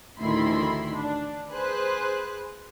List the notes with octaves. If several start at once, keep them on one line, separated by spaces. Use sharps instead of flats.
A1 D2 D#3 E4 B5 C6
D4
G#4 B4 C5 F#6